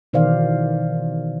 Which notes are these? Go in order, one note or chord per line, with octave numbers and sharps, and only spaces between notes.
B2 D#3 E3 C5 D5 F5